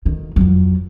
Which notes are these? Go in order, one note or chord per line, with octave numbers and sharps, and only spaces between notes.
D2 D#3
F2 F#3